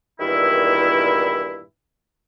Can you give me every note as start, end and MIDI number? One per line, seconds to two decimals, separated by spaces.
0.20 1.62 40
0.20 1.62 43
0.20 1.62 46
0.20 1.62 51
0.20 1.62 64